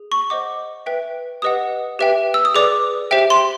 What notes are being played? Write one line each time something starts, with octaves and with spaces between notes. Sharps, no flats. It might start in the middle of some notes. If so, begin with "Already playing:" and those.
Already playing: G#4
C#6
C5 D#5 F#5 D6
B4 E5 G5
G4 B4 D#5 F#5 D#6
G4 B4 E5 G5
E6
D#6
G#4 B4 D5 D6
G4 C5 E5 G5
C6